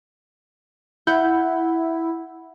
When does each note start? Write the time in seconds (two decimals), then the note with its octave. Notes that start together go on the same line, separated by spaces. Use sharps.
1.07 E4 F#5 G6